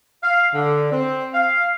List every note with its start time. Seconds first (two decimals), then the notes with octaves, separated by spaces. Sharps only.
0.23 F5
0.54 D3
0.92 C4
1.34 F5